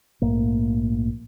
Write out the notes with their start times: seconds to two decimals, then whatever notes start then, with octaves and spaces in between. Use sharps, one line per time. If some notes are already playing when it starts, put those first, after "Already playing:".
0.22 A#1 G#2 A3 A#3